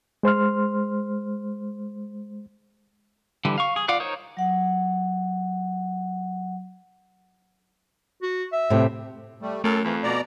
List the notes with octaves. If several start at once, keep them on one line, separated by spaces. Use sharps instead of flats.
G#3 C5 C6 F6
D3 E3 G3
F5 C#6
G#4
F4 D5 F5 F#5
D#4 A#4 C5 C#5
F#3 F#5
F#4
E5
A2 C3
G3 A3
F#2 A3 A4 F6
F2 E3
B2 D5 A#5